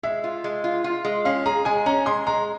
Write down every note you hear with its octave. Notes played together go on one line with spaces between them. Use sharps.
G#3 E5
F4
G#3
F4
F4
G#3
C#4 F5
G#4 A#5
G#3 G#5
C#4 A#5
G#3 C6
G#3 A#5